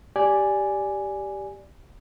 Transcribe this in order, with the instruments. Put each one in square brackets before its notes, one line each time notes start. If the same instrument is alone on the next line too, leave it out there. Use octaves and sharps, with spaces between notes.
[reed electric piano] G4 D5 G#5